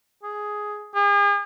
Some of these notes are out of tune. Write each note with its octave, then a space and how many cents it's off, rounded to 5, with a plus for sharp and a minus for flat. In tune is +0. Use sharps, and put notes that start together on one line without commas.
G#4 +5
G#4 -40